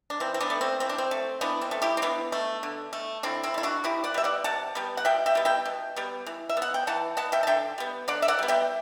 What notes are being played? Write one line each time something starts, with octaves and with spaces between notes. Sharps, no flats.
D4
E3 C4
C4
B3 D4
A3
C4
E3 C4
D4
C4
A3
E3 B3 D4
C4
A3
E4 G4
C4
E3 B3 D4
A3
D3
A3
D3 C4 E4
C4 E4
A3 E4
D4 F#4
C3 E4 G4
D5 F#5
G3 B3 E5
D5 F#5
C3 F#5 A5
G3 B3
F#5
B2 E5 G5
E5 G5
G3 B3
E5 G5
B2
G3 B3
E3
E5
B3
F#5
G5
E3 F#5 A5
B3 F#5 A5
E5 G5
A5
D3 E5 G5
G3 B3
D3 D5 F#5
E5
D5 F#5
G3 B3
E5 G5